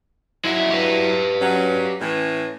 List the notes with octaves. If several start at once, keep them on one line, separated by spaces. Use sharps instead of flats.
F#3 G#3 E4 E5
G4 B4
F#3 C#4
A2 E3 C#4